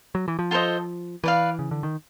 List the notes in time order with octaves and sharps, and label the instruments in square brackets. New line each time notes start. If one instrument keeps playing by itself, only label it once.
[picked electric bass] F#3
E3
F3
[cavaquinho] F4 A4 C5 D#5
[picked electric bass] E3 [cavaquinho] B4 D5 F5
[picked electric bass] C#3
D3
D#3